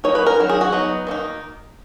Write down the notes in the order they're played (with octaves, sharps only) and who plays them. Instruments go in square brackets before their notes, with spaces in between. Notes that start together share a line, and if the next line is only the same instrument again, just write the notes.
[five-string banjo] F#3 A#3 D#4 C#5
B4
A#4
D#3 F#3
G#4
F#4
F#3 B3 D#4
D#3 A#3 D#4